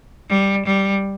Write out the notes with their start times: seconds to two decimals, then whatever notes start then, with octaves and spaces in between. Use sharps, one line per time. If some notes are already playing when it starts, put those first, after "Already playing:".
0.29 G3
0.66 G3